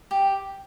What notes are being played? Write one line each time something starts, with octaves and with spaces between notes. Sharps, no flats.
G4